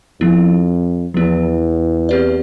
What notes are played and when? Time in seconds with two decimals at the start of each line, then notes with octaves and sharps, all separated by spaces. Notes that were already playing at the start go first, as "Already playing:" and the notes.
0.20 F2 F3 B3 E4
1.14 E2 F3 B3 E4
2.09 C4 E4 G4 B4 D5